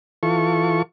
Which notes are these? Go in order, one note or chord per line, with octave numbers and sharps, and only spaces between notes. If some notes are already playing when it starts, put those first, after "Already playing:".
E3 F4 A4 C#6